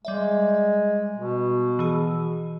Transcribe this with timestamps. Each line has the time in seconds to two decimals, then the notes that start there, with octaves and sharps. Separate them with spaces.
0.05 G3 G#3 D5 E5
1.18 B2
1.79 E3 G#4